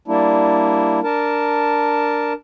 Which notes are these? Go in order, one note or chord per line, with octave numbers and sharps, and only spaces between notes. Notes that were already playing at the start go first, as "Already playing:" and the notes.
G3 A#3 D4 E4
D4 A#4 A5